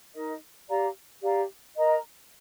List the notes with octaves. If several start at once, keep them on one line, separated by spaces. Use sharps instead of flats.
D#4 A#4 D#5
G4 D5 F5 A#5
G4 D5 F5 A#5
A#4 D#5 A#5